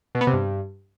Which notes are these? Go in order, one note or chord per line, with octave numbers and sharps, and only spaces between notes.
B2
B3
C3
G2